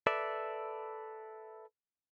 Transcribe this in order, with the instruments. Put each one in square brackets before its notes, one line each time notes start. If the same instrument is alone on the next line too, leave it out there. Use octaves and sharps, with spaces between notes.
[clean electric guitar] A4 B4 D5 E5